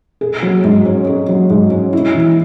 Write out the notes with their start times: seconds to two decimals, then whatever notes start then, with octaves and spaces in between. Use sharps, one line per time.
0.21 G#4
0.43 F#3
0.64 G#2
0.86 C#4
1.07 G#4
1.29 F#3
1.50 G#2
1.71 C#4
1.93 E4
2.15 E3